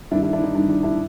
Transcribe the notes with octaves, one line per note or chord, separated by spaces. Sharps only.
G2 D#3 D4 E4
D4 E4
D4 E4
D#4
G2 D#3 D4
D4
D4 E4